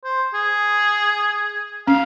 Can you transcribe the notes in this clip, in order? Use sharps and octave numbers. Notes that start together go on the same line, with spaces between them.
C5
G#4
C#4 F5